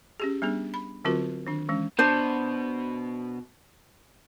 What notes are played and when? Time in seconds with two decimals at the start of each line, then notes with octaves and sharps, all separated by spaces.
0.20 C#4 G4 G#4
0.42 G3 B3 D4 G#4
0.74 B5
1.05 D3 F#3 C4 F4 F#4 A#4
1.47 D#3 D4
1.69 E3 G#3 C#4
1.99 B2 D4 C5